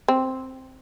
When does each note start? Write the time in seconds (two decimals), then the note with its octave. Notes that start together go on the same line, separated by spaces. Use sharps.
0.08 C4